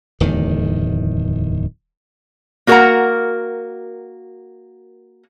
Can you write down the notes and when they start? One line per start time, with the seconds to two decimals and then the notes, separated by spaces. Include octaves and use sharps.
0.20 D1 E2 D#3
2.67 A#3 F#4 A#4 F5 F#5 A#5